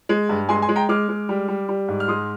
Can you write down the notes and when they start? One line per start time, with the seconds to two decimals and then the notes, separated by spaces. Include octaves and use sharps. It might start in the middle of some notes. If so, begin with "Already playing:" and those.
0.09 G#3
0.29 G2
0.49 G#3 G#5 C6
0.62 G#5 C6
0.69 G#3
0.76 G5 A#5
0.89 G#3 D6 F6
1.09 G#3
1.29 G3
1.48 G3
1.69 G3
1.88 G#2
2.00 F6
2.08 G#3 C6 D#6